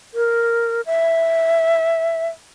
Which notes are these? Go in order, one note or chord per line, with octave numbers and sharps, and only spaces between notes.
A#4
E5